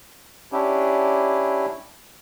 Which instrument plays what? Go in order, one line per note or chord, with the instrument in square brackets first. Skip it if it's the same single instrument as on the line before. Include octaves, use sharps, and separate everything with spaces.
[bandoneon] C#4 D4 E4 G4